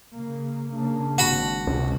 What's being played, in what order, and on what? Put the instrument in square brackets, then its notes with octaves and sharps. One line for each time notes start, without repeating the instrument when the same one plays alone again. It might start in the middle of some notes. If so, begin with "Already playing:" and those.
[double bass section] C#3 A#3
[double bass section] C#3 A#3 [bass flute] D4
[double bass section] G#1 C4 [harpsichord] F#4 B5
[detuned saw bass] C#2 [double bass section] C3